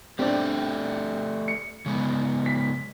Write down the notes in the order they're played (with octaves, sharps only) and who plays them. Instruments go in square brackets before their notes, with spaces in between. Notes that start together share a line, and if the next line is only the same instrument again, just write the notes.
[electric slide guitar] A3 G4 D5 [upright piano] C4 D4
[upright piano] C#7
[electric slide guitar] C#3 G#3 B3
[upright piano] B6